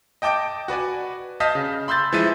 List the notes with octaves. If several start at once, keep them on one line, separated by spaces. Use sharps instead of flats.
D#5 G5 A5 D6 G6 D7
F#4 B4 D5 G#5
D#5 F5 A5 D#6 G6 B6
C#3
B5 C6 E6 G6 A6
E3 F3 G#3 E5 A6 D#7